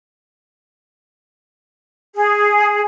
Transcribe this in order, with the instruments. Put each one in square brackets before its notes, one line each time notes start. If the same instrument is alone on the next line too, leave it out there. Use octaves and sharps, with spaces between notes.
[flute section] G#4